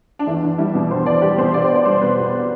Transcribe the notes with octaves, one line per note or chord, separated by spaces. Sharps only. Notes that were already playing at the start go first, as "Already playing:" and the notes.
D4
E2 E4
E2 D4
G3 E4
B2 D4
E2 C5
E2 D5
G3 G4
B2 C5
C2 D5
C5
C2
D5
G3 C5
B2 B4
C2